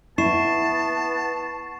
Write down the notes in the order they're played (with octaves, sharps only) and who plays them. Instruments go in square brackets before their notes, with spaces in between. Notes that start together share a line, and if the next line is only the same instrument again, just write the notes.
[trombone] B3 [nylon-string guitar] E4 [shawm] A5 [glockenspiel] C#6 C7 E7